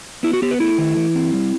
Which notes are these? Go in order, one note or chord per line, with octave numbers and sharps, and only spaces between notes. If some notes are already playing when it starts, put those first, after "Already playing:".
B3 E4
F#4
B3 G4
B4
A3 E4
D#3
E3
C4
G3